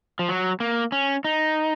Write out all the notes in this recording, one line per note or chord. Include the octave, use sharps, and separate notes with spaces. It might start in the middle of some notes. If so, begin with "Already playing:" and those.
F3
F#3
A#3
C#4
D#4